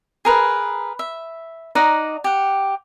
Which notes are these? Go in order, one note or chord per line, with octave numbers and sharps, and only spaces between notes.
G#4 A#4 B4
E5
D#4 D5 F#5 A#5
G4 F#5